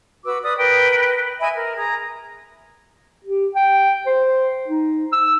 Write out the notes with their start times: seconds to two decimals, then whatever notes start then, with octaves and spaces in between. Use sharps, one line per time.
0.24 F#4 B4 D6 E6
0.43 B4 D5 D#6
0.57 A#4 B4 G5
1.40 D#5 E5 G#5 B5
1.55 A#4
1.77 G#4 A#5
3.24 G4
3.54 G5
4.07 C5
4.68 D#4
5.12 E6